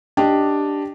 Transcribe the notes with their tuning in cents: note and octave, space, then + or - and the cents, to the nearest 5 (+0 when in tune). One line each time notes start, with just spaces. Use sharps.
D4 +0 G4 +0 D#5 +0